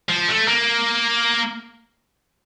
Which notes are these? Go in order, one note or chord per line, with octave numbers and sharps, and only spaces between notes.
F3
A3
A#3